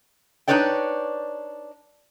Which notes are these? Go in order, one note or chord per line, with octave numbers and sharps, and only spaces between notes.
D4 D#4 B4 C#5 D5 G5